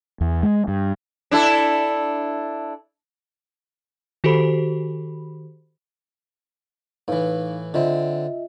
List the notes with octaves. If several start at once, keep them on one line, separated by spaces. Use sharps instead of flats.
E2
G#3
G2
D4 E4 A4
D#3 F#4 G4 A4 C5 B5
A2 E3 D#4 B4 F5
D3 C4 F4 D#5 E5